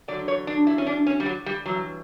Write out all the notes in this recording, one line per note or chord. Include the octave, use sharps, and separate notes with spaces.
E2 D3 F#3 D5
C#5
D4
E4
C#4
D4
C#4
G3
F#3
G3
G2 E3 F#3